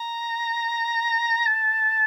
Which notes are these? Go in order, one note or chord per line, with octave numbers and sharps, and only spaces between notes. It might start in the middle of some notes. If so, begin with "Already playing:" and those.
Already playing: A#5
A5